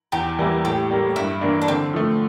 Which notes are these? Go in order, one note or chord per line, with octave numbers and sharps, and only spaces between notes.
E2 G4
E3 G3 A#3 E4
A2 G4
G3 A#3
G2 E4
E3 A#3 D4
D4
D3 C4
F3 A3